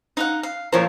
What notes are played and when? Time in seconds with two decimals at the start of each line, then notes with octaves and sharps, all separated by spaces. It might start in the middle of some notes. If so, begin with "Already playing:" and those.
0.17 D#4 F5 F#5
0.43 F5
0.72 A#2 F3 A#4 C5 C#5